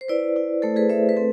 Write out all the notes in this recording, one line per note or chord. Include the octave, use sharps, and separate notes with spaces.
C5
E4 B4 D5
E4
A3 A4 C5
G#4 B4
A3 C5 E5
B4
C4 A4